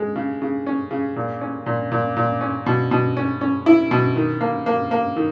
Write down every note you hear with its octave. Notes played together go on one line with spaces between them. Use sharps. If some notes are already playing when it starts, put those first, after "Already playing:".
Already playing: G#3
C#3
C#3
C#4
C#3
A#2
C#4
A#2
A#2
A#2
C#4
B2
B2
C#4
C#4
E4
B2
D#3
A#3
A#3
A#3
D#3